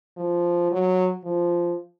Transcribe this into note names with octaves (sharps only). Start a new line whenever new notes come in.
F3
F#3
F3